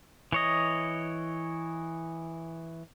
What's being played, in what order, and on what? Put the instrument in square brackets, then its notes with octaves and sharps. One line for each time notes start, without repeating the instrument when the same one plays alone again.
[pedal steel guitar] E3 C#5 D#5